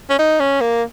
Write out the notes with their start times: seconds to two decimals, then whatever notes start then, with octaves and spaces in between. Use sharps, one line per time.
0.10 C#4
0.19 D#4
0.40 C#4
0.61 A#3